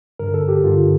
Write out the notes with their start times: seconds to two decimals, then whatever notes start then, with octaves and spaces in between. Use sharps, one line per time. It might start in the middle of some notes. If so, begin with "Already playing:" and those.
0.19 G2 D3 A#4
0.34 A4
0.48 G4
0.63 G2 D3 F4